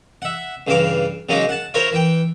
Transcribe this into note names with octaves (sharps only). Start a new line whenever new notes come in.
E5 F#5
G2 C#3 E3 F5 D6
C#3 F#3 G#3 A#3 C#4 D#4
F#5 A5
E4 A#4 C5 C#5 F5
E3 G5